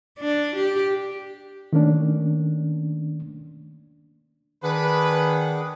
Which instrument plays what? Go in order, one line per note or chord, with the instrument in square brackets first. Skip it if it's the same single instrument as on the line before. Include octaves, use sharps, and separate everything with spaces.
[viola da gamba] D4
G4
[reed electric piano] D#3 A3 A#3 C#4 D4
[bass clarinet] D#3 [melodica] D4 G#4 F#5 [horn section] B4